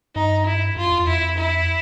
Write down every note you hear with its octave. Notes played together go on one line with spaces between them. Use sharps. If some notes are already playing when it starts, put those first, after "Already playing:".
G2 D#4
E4
F#2 F4
F2
F2 E4
E4